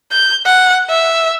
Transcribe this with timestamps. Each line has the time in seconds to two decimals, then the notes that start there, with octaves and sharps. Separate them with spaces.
0.12 G6
0.46 F#5
0.89 E5